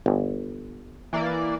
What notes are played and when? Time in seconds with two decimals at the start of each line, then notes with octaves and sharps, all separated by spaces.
0.06 G1
1.13 E3 A#3 D5